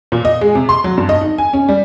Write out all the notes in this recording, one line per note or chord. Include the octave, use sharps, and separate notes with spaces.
A#2
D#5
G#3
C3
C6
F#3
G2
D#5
D#4
G#5
C#4
G3